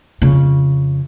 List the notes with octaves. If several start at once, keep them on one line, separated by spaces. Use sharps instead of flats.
F2 C#3